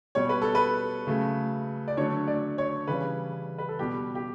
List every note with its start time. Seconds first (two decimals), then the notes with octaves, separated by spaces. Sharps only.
0.15 B2 G3 C#5
0.29 B4
0.42 A4
0.55 B4
1.07 C#3 F#3 A3
1.88 D5
1.97 D3 F#3 A3 C#5
2.27 D5
2.58 C#5
2.87 C#3 E3 G3 B4
3.58 B4
3.69 A4
3.79 B2 G3 G4
4.15 G4